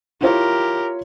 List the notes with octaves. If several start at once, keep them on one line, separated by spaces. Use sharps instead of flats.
E4 F4 G4 A#4 C#5